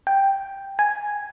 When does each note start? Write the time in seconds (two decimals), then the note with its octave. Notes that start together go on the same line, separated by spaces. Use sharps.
0.07 G5
0.79 G#5